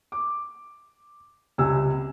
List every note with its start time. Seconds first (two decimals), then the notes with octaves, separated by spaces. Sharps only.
0.12 D6
1.58 C#2 C3 G3 G#5 E6